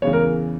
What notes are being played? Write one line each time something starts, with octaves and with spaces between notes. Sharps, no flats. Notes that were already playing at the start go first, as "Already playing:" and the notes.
E2 C#3 E3 C#5
A#4